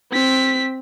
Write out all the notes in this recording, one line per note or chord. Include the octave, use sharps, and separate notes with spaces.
C4 B6